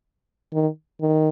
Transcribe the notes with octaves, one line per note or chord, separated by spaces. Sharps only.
D#3
D#3